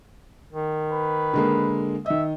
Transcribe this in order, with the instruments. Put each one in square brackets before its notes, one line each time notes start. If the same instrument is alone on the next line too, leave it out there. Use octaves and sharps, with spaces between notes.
[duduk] D#3
[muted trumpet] B4
[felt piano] D3 G#3 A#3
[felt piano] D#3 D#5 [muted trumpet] E5